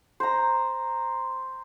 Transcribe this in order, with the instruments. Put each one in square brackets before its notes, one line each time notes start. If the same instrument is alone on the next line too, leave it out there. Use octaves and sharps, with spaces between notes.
[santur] C5 A#5